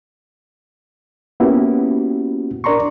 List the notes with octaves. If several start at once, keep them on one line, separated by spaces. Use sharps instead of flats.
A#3 B3 C#4 E4 F#4 G4
D4 A#4 D5 A#5 C6 C#6